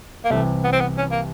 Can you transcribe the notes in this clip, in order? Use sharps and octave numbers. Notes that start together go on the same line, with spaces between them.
A#3
C2 C3 E3 A3
B3
C4
B3
C#4
A#3